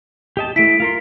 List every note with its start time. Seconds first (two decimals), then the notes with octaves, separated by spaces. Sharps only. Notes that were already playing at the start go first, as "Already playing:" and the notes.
0.37 G4 D#5 A5
0.56 A3 E4 B6 D7
0.80 F4 A#4 C6